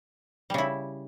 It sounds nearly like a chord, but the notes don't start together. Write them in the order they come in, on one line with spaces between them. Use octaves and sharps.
G3 C#3 E4